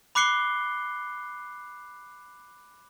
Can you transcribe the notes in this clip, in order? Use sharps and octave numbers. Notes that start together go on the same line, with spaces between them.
B5 D6 F#6 C7 C#7 G7